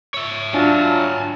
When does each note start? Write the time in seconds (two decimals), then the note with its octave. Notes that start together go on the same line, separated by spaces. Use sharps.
0.14 C#5 E5
0.54 F#3 D4 F4 G#5 A5